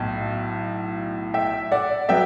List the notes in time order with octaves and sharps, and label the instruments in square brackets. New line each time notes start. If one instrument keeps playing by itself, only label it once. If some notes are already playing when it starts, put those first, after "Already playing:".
Already playing: [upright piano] B1 A2
E5 G5
D5 F#5
F#3 B3 E5 G5